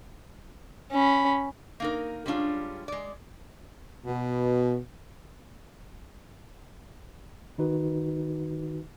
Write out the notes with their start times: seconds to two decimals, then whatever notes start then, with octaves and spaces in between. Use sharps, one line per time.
0.91 C#4 B5
1.80 A#3 D#4 A#4
2.26 G3 G#3 C#4 D4 F4
2.88 G#3 D5
4.07 B2
7.58 D#3 D#4 F#4 B4